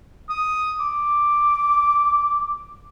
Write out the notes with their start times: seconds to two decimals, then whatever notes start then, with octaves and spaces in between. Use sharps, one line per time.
0.29 D#6
0.80 D6